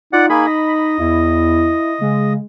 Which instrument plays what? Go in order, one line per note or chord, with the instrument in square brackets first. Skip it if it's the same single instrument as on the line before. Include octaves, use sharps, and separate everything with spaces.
[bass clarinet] D#4 [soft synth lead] F4 [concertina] D5 F#5
[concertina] A#3 G#4 [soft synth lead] B5
[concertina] D#5
[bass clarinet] E2 [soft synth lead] E4
[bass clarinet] C#3 [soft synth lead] G#3